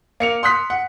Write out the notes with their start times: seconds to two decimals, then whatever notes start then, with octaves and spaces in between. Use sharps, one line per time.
0.20 A#3 C#7 F7
0.43 C6 D#6 F#6 B6
0.70 F#5